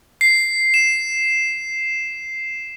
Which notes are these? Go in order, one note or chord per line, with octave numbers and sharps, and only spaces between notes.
C7
E7